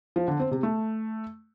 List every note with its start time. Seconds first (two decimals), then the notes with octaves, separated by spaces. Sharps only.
0.16 F3
0.28 D3
0.40 C4
0.51 C3
0.63 A3